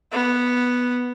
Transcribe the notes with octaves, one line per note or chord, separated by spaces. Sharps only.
B3